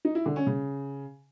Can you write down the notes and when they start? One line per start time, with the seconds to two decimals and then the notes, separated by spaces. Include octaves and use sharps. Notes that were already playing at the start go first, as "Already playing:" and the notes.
0.05 D#4
0.15 E4
0.26 D3
0.36 C#4
0.47 C#3